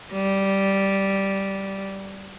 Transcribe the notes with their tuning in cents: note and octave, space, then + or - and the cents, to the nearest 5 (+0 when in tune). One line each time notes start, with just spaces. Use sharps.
G3 -5